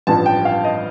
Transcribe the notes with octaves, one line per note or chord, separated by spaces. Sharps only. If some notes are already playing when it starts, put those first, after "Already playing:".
A1 G2 F3 A5
G5
F5
D#5